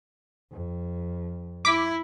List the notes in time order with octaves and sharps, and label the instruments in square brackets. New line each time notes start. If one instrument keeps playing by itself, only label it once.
[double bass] F2
[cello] E4 [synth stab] D6 B6